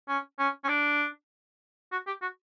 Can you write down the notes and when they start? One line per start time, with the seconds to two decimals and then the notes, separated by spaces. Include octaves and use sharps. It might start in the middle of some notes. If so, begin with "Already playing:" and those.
0.08 C#4
0.39 C#4
0.64 C#4
0.69 D4
1.92 F#4
2.07 G4
2.22 F#4